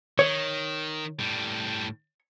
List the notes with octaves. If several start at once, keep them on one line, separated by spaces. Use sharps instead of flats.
D#3 C#5
A2 G3